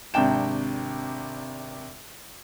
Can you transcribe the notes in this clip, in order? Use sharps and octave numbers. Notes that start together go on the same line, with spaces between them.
G#1 C3 D4 G5 E7